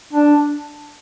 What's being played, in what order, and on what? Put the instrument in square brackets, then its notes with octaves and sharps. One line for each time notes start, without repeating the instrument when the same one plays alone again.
[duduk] D4